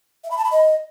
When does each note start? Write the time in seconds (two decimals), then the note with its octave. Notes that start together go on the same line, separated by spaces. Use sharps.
0.24 E5
0.31 B5
0.38 A5
0.44 B5
0.51 D#5